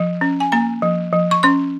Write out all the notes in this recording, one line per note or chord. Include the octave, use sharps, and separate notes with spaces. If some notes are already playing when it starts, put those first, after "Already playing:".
Already playing: F3
C#4
G#5
A#3 A#5
F3
F3
C#6
C#4 C6